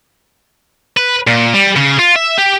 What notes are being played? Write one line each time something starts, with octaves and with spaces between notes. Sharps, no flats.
B4
A#2
G3
C#3
F4
E5
G4